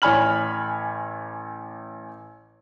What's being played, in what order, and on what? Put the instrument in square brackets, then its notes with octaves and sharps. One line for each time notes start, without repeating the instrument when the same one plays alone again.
[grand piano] A1 C#5 G#5 B5 F6 F#7